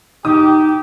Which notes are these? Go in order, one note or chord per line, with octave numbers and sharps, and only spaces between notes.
D#4 G4 D#6